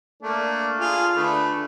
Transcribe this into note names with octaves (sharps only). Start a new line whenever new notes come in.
A3 A#3 D4
F4 G#4
D3 A3 B4